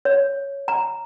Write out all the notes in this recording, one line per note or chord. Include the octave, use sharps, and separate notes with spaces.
C#5
A#5